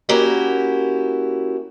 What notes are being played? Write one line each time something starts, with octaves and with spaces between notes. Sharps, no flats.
A#3 C#4 E4 F#4 G4